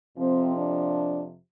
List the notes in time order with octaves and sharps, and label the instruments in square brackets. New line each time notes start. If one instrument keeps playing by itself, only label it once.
[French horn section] F2 C3 F3 C4
D4